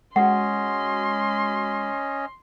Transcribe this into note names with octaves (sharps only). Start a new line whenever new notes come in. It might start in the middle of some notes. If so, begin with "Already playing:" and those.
G#3 C#4 F#4 D#5 F#5 C6